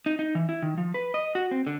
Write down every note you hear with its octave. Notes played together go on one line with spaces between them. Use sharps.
D#4
D#4
E3
E4
D#3
F3
B4
D#5
F#4
C4
D3